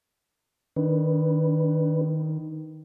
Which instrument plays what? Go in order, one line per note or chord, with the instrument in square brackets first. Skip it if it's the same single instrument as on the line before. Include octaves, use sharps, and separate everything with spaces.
[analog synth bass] D#3 [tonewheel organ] D4 B4